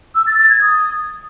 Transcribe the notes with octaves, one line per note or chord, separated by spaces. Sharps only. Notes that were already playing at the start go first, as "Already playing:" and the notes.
E6
A6
A6
G#6
D#6